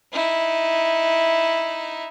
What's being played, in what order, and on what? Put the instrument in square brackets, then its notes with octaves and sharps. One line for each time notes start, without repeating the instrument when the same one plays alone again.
[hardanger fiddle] D#4 E4